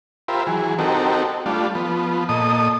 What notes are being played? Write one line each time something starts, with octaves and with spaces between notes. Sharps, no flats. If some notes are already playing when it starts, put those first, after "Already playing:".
F4 G4 A#4 C5 E5 B5
E3 F#3 G#4
C4 D#4 F#4 G4 A4 A#4
G3 A3 D4 F4
F3 B3
A#2 A4 D#5 D#6